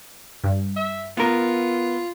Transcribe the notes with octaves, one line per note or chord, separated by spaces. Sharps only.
G2
E5
B3 F4 A#4